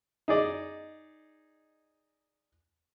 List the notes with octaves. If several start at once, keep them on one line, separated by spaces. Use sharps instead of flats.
D#4 G#4 D5 D#5